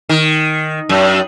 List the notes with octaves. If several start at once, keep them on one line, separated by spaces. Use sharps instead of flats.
D#3
F#2